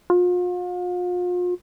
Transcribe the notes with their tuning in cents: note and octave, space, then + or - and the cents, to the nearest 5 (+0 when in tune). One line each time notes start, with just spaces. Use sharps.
F4 +40